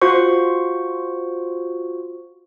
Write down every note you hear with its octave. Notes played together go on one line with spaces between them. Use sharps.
F4 F#4 C5 C#6